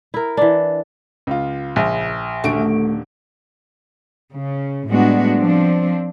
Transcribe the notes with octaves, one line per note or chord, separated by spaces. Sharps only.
E4 A#4
E3 D4
C#2 F4
A#1
D#1 D3 A3 F#4 D7
C#3
A2 G3 G#3 B3 D4 F#4
F3 C4 D4